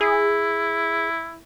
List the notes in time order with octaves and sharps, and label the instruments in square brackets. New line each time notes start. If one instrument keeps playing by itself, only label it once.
[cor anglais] E4 [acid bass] G#4